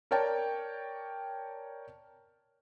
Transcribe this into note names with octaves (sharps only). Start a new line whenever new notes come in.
A#4 C#5 D5 G5 A5